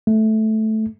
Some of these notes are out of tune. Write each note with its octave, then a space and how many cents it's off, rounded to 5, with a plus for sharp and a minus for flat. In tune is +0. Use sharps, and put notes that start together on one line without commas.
A3 -10